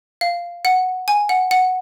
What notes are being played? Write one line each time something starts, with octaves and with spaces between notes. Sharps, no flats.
F5
F#5
G#5
F#5
F#5